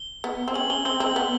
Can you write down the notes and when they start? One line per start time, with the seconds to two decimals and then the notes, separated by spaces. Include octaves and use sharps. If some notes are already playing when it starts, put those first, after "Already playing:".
Already playing: G7
0.24 B3
0.48 C4
0.54 C#4 F#7
0.70 C#4 G7
0.85 C4 G7
1.00 C4 F#7
1.16 B3